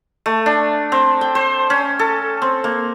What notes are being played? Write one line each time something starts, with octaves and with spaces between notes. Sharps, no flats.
A3
D4
C4
G5
C5
C#4
A4
C4
A#3